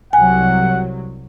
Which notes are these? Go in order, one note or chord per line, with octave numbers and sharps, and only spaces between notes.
C2 F#3 F#5 G#5